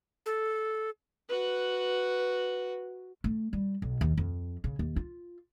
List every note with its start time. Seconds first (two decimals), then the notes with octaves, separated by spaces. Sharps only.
0.26 A4
1.29 F#4 B4
3.24 A3
3.53 G3
3.82 B1
4.01 D#2
4.17 F2
4.64 C#3
4.79 D#2
4.96 F4